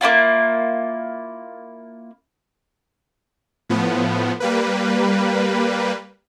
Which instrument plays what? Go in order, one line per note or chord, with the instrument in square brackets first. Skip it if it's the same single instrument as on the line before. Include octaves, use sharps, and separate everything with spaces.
[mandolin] A#3 C#4 E4 F4
[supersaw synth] A2 F3 B3
G3 A#3 B4